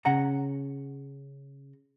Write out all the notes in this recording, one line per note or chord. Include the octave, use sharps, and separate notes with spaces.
C#3 C#4 F#5 A#5